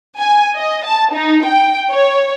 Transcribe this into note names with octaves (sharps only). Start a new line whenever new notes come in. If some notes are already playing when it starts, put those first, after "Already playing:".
G#5
D#5
A5
D#4
G5
C#5